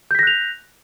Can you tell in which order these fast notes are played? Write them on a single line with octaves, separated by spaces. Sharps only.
G6 B6 A#6 F#6 F7